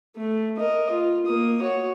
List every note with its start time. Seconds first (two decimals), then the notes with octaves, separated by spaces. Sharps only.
0.17 A3
0.57 A#4 D#5
0.91 F4
1.26 A#3 D#6
1.61 F#4 C#5